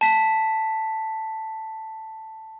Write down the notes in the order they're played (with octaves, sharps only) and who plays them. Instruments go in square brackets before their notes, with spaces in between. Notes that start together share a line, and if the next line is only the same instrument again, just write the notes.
[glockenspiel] A5 B6